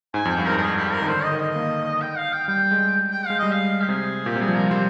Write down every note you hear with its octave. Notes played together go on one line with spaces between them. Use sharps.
G#2 G#5
F2
G5
G2
A#4
G#2
A#4
G#4
G4
A#4
D#3
D3 C5
D#5
D#3
D#5
A#3
G5
F5
G5
G3 G5
G#3
G5
G#3 F5
G3 D#5
F5
G4
C3 G#4
A#2 G4
C3
G3 G#4
F3
G3 A#4
G3 C5